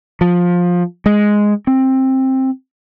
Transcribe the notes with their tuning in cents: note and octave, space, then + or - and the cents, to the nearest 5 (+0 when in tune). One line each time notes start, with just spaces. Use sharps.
F3 +15
G#3 +0
C4 +15